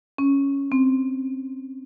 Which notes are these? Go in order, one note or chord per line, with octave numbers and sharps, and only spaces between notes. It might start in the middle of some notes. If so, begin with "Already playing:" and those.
C#4
C4